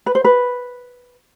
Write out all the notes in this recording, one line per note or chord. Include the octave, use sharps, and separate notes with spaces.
B4
C5
B4